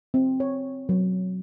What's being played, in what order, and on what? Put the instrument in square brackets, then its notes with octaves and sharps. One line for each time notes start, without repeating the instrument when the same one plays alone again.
[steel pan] C4
C#5
F#3